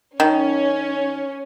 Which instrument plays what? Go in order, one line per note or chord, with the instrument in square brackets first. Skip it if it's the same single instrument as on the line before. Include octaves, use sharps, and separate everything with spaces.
[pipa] D#3 [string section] C#4